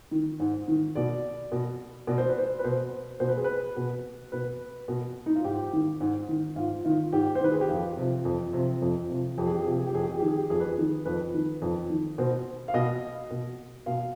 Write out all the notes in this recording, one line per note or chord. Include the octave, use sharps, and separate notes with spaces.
D#3
G#2
D#3
B2 D5
B2
B2 D5
C5
B4
C5
B4
B2 C5
B2 C5
B4
G#4
B4
B2
B2 B4
B2
D#4
F4
G#2 G4
D#3
G#2
D#3
G#2 F4
D#3 F4
G#2 G4
C5
D#3 B4
G#4
G4
F2 F4
C3 F3
F2
C3 F3
F2
C3 F3
F2 G4
G#4
G4
G#4
C3 F3 G4
G#4
G4
F2 G#4
G4
G#4
D#3 G4
G#4
G4
F2 G#4
B4
G#4
D#3
F2 B4
D#3
F2
D#3
B2 C5
F5
B2 D#5
B2
B2 F5